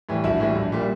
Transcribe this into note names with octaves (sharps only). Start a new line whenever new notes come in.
A2 E3 G3
A#1 E4 F#4
A2 E3 G3
A#1
A#2 G3